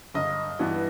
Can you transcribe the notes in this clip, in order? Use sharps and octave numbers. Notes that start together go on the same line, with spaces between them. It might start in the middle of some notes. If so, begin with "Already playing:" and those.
G1 D#5
G2 E3 B3